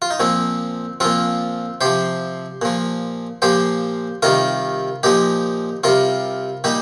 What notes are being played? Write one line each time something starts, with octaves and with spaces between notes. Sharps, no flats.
F4
D#4
A#2 F3 C4
A#2 F3 C4 F4
C3 F3 G4 C5
A#2 F3
A#2 F3 G4 C5
C3 D#3 G3 F4 A#4
A#2 F3 D#4 G4
C3 G3 F4 A#4
A#2 G3 D#4 G4